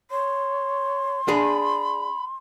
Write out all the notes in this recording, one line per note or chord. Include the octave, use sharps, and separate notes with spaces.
C#5 C6
D4 G#4 B5